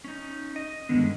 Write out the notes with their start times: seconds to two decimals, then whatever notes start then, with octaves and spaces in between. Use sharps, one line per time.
0.04 C#4 D#4
0.56 D#5
0.89 G2 D3 D#3 G#3 B3